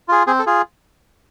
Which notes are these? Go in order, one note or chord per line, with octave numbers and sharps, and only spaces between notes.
F4 G#4
C4 G#4
A4
F4 G#4